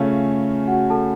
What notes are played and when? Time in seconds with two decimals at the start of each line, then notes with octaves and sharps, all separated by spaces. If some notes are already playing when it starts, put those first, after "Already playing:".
Already playing: C#3 A3 C#4 F4 F5
0.67 F#4 F#5
0.90 A4 A5